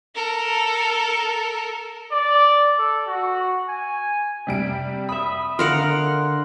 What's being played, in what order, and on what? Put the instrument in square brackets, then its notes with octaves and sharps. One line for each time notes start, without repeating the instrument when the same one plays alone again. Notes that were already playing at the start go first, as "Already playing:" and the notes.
[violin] A4 A#4
[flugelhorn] D5
A4
F#4
G#5
[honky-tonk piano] C3 G3 D7
[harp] E5 B5 [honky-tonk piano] D#6
[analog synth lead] D3 [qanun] A#4 F5 F#5 [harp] C6